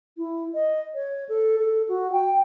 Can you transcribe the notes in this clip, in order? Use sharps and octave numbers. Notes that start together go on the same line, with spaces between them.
E4
D#5
C#5
A4
A4
F#4
G5